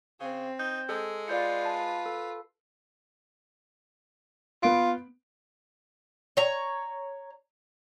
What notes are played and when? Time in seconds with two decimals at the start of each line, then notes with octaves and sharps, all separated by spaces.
0.21 C#3 C4
0.59 D#4 G6
0.89 G#3 A4
1.28 F4 B4 D5 G6 C#7
1.65 A5
2.06 A4
4.63 B3 F4 D7
6.37 C#5 A#5